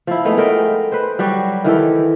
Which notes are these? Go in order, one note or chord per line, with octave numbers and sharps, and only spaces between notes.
F3 E4
A3 B3 D#4 G#4
G#3 A3 A#4 G5
B4 C5
F#3 G3 F#4 G4
D#3 E3 G4 A4